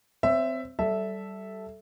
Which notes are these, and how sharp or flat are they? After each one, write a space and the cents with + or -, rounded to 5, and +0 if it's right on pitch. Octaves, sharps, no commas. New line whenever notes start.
C4 -20 C#5 +10 E5 +10
G3 -20 A4 -5 E5 -5